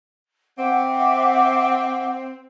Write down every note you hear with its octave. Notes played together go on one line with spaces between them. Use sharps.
C4 E5 F#5 D6